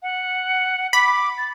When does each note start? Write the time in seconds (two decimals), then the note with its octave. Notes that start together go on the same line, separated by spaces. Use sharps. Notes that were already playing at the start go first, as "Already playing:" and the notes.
0.03 F#5
0.93 B5 D6
1.38 A6